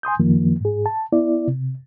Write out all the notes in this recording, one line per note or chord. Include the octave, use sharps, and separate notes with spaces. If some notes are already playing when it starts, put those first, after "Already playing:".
G#5 C6 D#6 G6
F#2 D#3 F3 A#3
G#2 G#4
A5
B3 E4 D5
C3